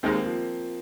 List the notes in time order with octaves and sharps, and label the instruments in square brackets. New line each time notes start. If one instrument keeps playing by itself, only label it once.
[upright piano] D#2 D#3 G#3 D#4 [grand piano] C4
[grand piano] A#3
F3